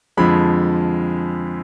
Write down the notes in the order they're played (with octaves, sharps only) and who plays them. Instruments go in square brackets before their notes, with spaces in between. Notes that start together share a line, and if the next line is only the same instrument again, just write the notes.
[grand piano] F2 D3 F3 G#3 B5